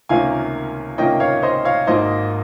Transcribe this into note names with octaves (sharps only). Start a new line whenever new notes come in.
C#2 C3 D#3 A#3 C#4 F5 G#5
C#2 C3 D#3 A#3 C#4 D#5 G5
C#5 F5
C5 D#5
C#5 F5
G#1 G#2 D#3 A#3 C5 D#5